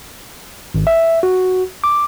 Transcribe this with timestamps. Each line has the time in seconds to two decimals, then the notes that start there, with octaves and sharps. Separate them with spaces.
0.74 G#1
0.87 E5
1.23 F#4
1.84 D6